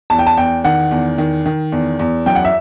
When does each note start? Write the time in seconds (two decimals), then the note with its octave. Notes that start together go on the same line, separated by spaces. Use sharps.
0.10 E2 A5
0.19 G5
0.27 A5
0.37 E2 G5
0.64 D#3 F#5
0.91 E2
1.18 D#3
1.46 D#3
1.72 E2
1.99 E2
2.26 F#2 G5
2.35 F#5
2.45 E5